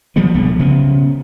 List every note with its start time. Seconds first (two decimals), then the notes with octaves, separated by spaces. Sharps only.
0.16 F3 G3 G#3 B3
0.34 D1 B1 D3 B3
0.59 C#3 B3